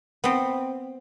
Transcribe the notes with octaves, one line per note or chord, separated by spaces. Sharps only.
B3 C4